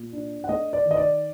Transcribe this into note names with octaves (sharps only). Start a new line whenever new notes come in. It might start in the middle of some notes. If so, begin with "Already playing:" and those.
Already playing: A#2
D4
F#5
A3 D#5
D5
D#3
D#5
D5